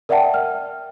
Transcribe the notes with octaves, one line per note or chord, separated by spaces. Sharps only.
A#4 D5 E5 F#5 G5 A5
F6